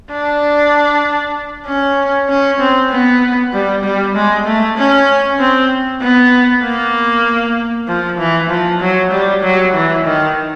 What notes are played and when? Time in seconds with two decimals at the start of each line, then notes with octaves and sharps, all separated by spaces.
0.12 D4
1.66 C#4
2.29 C#4
2.60 C4
2.91 B3
3.53 G3
3.84 G3
4.15 G#3
4.46 A3
4.77 C#4
5.39 C4
6.02 B3
6.64 A#3
7.88 F3
8.19 E3
8.50 F3
8.81 F#3
9.12 G3
9.43 F#3
9.74 E3
10.05 D#3